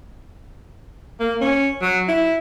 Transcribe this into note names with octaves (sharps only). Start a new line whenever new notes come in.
A#3
C#4
F#3
E4